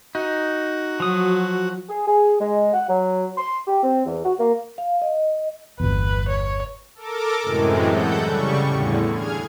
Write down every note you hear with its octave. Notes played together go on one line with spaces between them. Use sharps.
D#4 F#4
F3 F#3 D#6
G#4
G#4
G#3
F#5
F#3
C6
G4
C4
E2
F#4
A#3
F5
D#5
G1 E2 B4
C#5
A4 A#4 D6
F#2 A2 C3 E3 G#3
A4 F#5 G6
C#3 G3 C#6
E2 A2 D3
G#4 F6 G#6